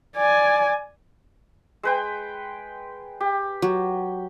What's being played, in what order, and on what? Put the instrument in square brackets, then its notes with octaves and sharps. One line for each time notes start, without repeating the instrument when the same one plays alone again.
[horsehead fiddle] D5 G#5
[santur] G#3 B4 G5
G4
[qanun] F#3